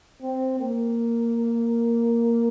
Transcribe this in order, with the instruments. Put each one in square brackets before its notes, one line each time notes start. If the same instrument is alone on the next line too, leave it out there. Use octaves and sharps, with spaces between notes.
[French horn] C4
A#3